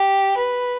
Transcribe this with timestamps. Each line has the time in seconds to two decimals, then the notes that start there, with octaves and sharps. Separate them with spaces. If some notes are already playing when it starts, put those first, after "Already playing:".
Already playing: G4
0.37 B4